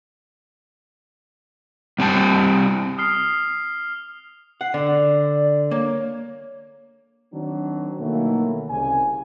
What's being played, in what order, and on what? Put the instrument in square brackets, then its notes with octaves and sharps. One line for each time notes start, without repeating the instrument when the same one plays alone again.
[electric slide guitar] G3 C4 G4 G#5 A5
[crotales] D#6 F6 C7
[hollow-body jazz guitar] F#5 [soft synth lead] C7
[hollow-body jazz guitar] D3 [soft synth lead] D5
[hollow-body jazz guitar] A#3 [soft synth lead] C#5
[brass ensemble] D#3 F#3 C4 D4
B2 D#3 E3 F#3 A3 A#3
C2 C#3 G#5